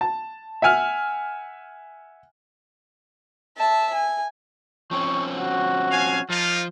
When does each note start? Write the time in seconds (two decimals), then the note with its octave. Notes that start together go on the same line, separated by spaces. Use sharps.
0.01 A5
0.62 E5 F#5 G#5 F6
3.57 E5 A5
3.94 G#5
4.91 F3 C4 C#4 C#6
5.37 F#4
5.91 F5 G#5
6.30 F3 A#3 D#4 F4